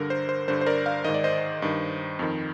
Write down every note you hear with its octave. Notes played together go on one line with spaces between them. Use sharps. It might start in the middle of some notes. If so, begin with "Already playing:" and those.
Already playing: G2 D3 A#4
C5
C5
G2 D3 C5
C5
A#4 D5
D5 F5
G#2 D#3 D#5
D5
C5 D#5
G2 D#3
F2 D#3